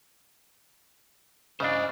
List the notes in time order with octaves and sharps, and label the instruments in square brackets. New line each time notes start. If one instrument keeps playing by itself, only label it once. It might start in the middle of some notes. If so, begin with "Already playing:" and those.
[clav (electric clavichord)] C#3 D4 [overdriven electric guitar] C5 D#5